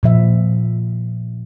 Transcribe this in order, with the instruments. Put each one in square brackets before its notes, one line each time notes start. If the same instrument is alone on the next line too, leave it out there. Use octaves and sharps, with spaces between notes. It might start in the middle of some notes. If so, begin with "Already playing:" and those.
[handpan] A#2 F3 E5